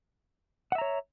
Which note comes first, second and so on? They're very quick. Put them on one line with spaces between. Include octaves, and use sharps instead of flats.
F#5 E5 A#5 C#5